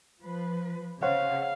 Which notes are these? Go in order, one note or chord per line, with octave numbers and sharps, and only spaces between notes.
F3 B4
C#3 C5 C#5 F5 F#5